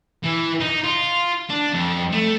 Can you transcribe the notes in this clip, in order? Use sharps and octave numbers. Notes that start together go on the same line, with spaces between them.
E3
D#4
F4
D4
F2
A3